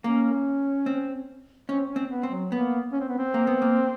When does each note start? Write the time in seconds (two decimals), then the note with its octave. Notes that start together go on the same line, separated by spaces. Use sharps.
0.04 A#3 C#4
0.86 C4
1.69 C4 C#4
1.90 C#4
1.96 C4
2.10 B3
2.23 C4
2.30 F#3
2.51 A#3 B3
2.92 C#4
3.00 C4
3.09 B3
3.18 C4
3.34 A#3
3.47 B3
3.62 A#3